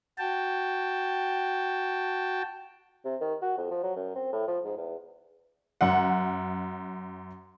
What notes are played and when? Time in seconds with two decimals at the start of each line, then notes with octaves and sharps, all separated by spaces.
0.18 F#4 G5 A5
3.05 C3
3.21 D#3
3.42 F#4
3.58 F2
3.71 F3
3.83 F#3
3.96 F#2
4.15 C4
4.33 A2
4.48 F3
4.65 G#2
4.77 E2
5.81 F#2 F#5